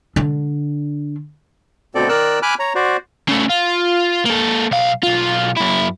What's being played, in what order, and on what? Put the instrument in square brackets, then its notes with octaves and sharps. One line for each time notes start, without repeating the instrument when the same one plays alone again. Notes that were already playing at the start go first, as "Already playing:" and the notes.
[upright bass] D3 D4
[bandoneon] D2 B2 C4 A4 D5
D#3 A#4 D5 E6 F#6
G#5 B5 D6 F6 F#6
C#5 A#5
F#4 C5 D5
[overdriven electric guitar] C#3 A3
F4
A#3 A4
B1 F5
B1 F4
F#2 E4